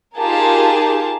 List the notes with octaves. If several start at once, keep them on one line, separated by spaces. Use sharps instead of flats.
D#4 F4 G4 G#4 A#4 A5